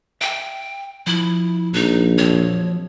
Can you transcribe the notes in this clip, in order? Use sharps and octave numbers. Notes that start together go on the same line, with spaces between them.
E5 G5
F3 E4
A#1 D#4
F3 F#3 C4 C#5